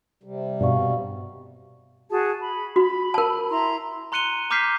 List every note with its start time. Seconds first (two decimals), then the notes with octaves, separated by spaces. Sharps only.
0.23 C3 G3
0.61 G2 B2 D5 F5 C#6
2.10 F#4 G#4 A5
2.40 B5
2.76 F#4 B5
3.14 A#4 A5
3.50 E4 A#5 C6
4.12 A#5 C6 F#6 C#7 D#7 G7
4.50 A#5 D6 F6 G6 B6 C7